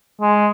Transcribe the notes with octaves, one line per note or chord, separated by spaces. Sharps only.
G#3